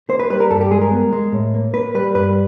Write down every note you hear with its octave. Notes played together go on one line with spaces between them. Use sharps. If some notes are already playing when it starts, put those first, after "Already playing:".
A#3 C5
B4
G3 B4
A#4
G2 A4
G4
G#3 G#4
A#4
B3
G#3
A2
A#3
A#3 B4
G3 B4
G2 B4